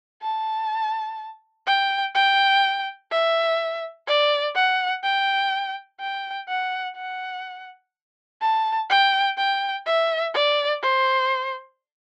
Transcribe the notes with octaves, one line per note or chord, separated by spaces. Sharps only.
A5
G5
G5
E5
D5
F#5
G5
G5
F#5
F#5
A5
G5
G5
E5
D5
C5